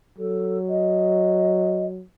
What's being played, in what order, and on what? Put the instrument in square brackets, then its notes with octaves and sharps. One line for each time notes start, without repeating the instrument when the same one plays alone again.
[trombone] F#3 [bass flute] A4
[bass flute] D#5